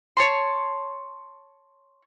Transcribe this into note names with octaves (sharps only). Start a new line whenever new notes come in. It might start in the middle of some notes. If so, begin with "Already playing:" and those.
C#5 A5 C6